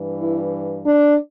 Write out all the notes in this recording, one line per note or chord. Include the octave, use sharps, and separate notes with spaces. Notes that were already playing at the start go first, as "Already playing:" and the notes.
Already playing: G2 E3
E4
D4